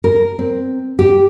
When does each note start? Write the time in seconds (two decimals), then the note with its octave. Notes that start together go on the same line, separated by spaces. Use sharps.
0.04 A#4
0.39 C4
0.99 G4